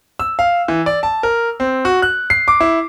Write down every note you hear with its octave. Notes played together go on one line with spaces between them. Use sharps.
E6
F5
E3
D5
A5
A#4
C4
F#4
F#6
C7
D6
E4